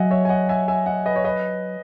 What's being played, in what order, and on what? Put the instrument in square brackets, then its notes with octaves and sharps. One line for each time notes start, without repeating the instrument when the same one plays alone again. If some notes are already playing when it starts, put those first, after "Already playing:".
Already playing: [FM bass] F#3 [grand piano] D#5 E5 F#5 G#5
[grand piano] C#5 E5
G#5
D#5 F#5
E5 G#5
E5 G#5
D#5 F#5
B4 D#5
C#5
B4 D#5